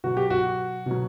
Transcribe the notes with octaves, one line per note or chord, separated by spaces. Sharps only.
B2 F#3 F#4
G4
F#4
B2 F#3